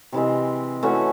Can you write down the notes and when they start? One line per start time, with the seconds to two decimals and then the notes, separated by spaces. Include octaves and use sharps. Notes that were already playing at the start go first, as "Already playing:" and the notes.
0.13 C3 E3 G#3 C4
0.83 E3 A3 C#4 F#4